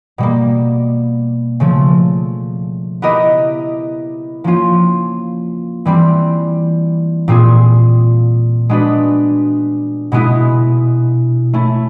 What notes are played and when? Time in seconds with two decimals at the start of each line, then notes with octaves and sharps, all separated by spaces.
0.18 B2 G3 A#3
1.60 C#3 F3 A3
3.02 B3 E4 G4 A#4 D#5
4.44 F3 A#3 C#4 F4
5.85 E3 G3 C4
7.28 A#2 G3 C4 F4 G#4
8.69 G#3 B3 D4 F#4 B4
10.12 B2 G#3 B3 E4
11.53 A3 C#4 E4